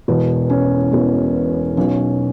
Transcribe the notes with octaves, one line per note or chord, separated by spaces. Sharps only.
E1 E2 B2
C#4
E1 E2 B2
B1 B2 C#4